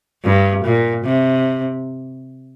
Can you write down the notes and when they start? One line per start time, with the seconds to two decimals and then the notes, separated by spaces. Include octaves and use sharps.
0.24 G2
0.65 A#2
1.05 C3